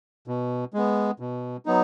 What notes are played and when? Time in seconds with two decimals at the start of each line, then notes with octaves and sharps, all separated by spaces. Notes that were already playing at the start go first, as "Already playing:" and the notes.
0.28 B2
0.74 G#3 B3
1.20 B2
1.66 F#3 B3 D#4